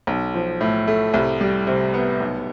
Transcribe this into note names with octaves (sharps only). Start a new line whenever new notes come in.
B1
F3
A2
A3
C2
G3
C3
B3
B1